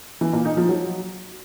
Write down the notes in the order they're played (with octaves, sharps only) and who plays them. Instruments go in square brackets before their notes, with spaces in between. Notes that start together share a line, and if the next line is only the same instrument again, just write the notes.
[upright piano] E3
A#2
D#4
F3
F#3